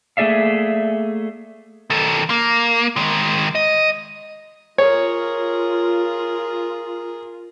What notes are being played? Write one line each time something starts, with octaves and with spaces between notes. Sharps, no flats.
A3 A#3 G#4 D5 E5 F5
D#3 A4
A#3
D#3 G#3
D#5
F4 G#4 A#4 C#5